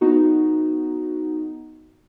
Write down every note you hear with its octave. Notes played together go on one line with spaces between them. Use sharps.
B3 D#4 F#4